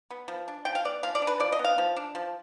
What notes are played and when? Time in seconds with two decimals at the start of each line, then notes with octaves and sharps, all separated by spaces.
0.10 B3
0.28 F3
0.48 D4
0.65 F3 G5
0.75 F5
0.85 B3 D5
1.03 F3 F5
1.15 D5
1.22 D4
1.27 B4
1.40 F3 D5
1.52 D#5
1.59 B3
1.64 F5
1.78 F3
1.96 D4
2.15 F3